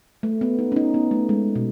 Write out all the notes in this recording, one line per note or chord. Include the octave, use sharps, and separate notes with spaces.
A3
B3
D#4
C#4
D#4
B3
A3
G#3
B2